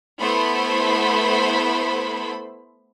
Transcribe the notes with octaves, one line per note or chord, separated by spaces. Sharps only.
A3 B3 E4 C5 B5